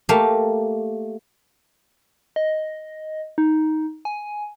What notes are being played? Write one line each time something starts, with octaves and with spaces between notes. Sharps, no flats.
A3 A#3 G4 F5 A5
D#5
D#4
G#5